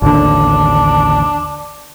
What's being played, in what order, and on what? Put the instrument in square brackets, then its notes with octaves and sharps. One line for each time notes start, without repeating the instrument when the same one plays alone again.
[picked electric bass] A1 D#2 D3 [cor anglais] D4